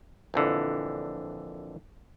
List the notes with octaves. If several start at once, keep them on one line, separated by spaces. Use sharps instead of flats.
A#1 F2 D3 E3